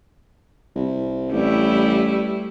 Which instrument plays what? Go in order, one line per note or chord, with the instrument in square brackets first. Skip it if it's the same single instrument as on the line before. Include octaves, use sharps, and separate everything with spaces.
[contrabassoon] C2
[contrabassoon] A1 [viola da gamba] G3 A3 E4